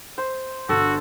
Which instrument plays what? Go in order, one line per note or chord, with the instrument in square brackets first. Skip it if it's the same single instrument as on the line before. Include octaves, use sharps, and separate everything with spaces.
[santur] C5
[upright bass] G1 D3 [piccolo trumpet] F#4 [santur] A4